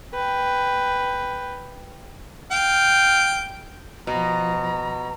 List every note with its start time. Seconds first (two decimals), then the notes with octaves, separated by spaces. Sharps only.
0.14 B4 G5
2.52 F5 G5
4.07 B2 F3 A#5